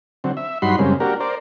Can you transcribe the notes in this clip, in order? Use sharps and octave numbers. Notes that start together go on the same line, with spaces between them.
D3 F#3 C4
E5
G2 F#3 D#4 F#4 B5 C6
F#2 C#3 G3 G#3 A#3 C4
A#3 D4 F#4 G4 A#4
A#4 C5 D5